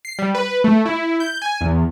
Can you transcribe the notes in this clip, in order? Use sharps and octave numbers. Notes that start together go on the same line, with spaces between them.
C7
G3
B4
A3
E4
G6
G#5
E2